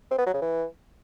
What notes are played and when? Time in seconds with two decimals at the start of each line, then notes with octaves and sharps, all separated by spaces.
0.11 C4
0.18 B3
0.26 F#3
0.34 C#3
0.42 E3